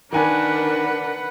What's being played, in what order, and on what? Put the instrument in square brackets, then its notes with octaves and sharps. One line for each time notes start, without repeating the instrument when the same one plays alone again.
[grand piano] D#3 G#5 [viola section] D4 A#4 [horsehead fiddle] B4 F#5